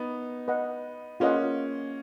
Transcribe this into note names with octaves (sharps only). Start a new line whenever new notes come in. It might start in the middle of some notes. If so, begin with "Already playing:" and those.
Already playing: B3 D#4
B4 D#5 F#5
A#3 C#4 F4 G#4 B4 D#5 F#5